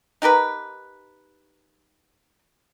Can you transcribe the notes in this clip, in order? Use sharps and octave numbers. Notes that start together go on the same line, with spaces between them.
D#4 G4 A#4 B4